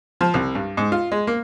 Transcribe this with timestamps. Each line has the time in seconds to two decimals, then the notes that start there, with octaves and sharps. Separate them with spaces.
0.21 F3
0.34 C2
0.55 G2
0.77 G#2
0.92 F4
1.12 G#3
1.27 A#3